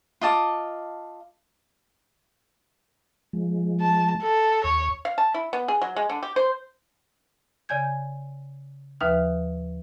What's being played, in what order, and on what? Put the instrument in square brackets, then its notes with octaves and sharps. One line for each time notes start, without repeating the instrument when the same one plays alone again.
[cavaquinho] F4 D#5 A5 D6
[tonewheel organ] F3 G#3
[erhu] A5
A4
[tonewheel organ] D#2 [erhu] C#5
[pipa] F5
A5
E4
B3
G#4
F#3
G#3
D3
G4
C5
[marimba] C#3 D5 G#5 G6 G#6
D#2 F3 D#4 B4 E5 F6